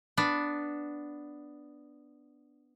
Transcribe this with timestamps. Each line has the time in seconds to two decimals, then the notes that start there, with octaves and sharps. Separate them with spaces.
0.17 B3 D4